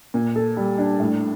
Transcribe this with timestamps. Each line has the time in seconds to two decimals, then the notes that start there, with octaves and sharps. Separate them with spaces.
0.14 A#2
0.36 A4
0.57 G3
0.78 D4
1.00 A2